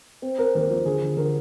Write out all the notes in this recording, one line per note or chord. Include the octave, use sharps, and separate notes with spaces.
C4
C4 A#4
D#2 A#4
F3
D3 G#4
D3
D3 A#4